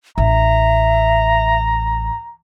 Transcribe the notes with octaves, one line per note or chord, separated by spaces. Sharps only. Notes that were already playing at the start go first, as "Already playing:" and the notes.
A1 E5 A#5